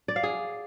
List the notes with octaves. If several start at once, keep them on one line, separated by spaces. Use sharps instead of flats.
D5
F5
G#4